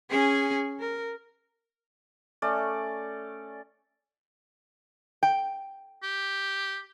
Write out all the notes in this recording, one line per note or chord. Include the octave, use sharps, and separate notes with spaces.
C#4 G#4
A#4
A3 C#4 D5
G5
G4